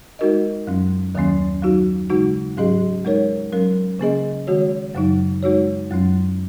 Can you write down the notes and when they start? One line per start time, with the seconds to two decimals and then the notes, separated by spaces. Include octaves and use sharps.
0.19 G#3 D#4 F#4 A#4 D#5
0.67 F#2 F#3 C#4
1.15 D#2 D#3 F#3 A#3 C#4
1.62 F#3 D#4 F#4
2.10 C#3 G#3 D#4 F#4
2.57 G#2 F#3 C#4 G#4 D#5
3.05 G#3 D#4 A#4 C#5
3.52 F#3 C#4 A#4
3.99 C#3 A#3 C#4 G#4 D#5
4.47 D#3 G#3 F#4 C#5
4.95 F#2 C#3 F#3 D#4
5.43 G#3 D#4 F#4 C#5
5.91 F#2 F#3 C#4